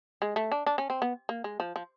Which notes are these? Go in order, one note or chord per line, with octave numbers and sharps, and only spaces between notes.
G#3
A3
D4
D4
C#4
C4
B3
A#3
G#3
F3
F3